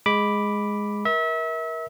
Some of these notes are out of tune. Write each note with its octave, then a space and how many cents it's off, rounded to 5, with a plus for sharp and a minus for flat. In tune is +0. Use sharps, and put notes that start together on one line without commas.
G#3 +0 B5 +0 D6 +0
A#4 +25 E5 -30